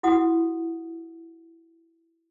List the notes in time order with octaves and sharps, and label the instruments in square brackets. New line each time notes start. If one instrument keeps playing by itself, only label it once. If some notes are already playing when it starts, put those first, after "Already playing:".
[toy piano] E4 F#4 F#5 D#6